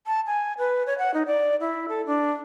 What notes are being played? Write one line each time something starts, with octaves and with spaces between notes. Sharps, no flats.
A5
G#5
B4
C#5
F#5
D#4
D5
E4
A4
D4